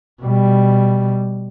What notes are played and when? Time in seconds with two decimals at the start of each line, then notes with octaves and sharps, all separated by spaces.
0.22 B2 G3